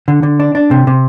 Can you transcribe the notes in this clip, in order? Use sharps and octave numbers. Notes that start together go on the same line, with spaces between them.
D3
D3
D4
D4
C3
C3